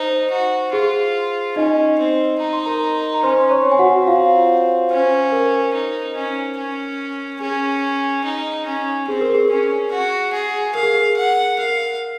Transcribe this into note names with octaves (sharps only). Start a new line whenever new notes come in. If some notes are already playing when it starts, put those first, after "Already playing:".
Already playing: D#4 C5
F#4
F4 G#4
C#4 D#4 D#5
C4
D#4 A#5
C6
A#4 A#5
A#5
C#4 C5 C6
C#5 C#6
C4
G#5
F#4 F#5
F#5
F4 F5
C#4 C5
A#4
D#4
C#4
C#4
C#4 G#4
D#4
C#4
C4 G#4
A#4
G#4
C#4
F#4
G#4
A#4 F5
G#4
G#4
F#5
A#4 F5